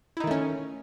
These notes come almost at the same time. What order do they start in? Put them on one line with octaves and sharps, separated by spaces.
E4 D#4 D#3 A3 C#4